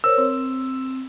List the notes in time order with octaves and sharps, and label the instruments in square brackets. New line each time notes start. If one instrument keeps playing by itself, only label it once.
[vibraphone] A#4 C5 C#5 [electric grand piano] E6
[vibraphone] C4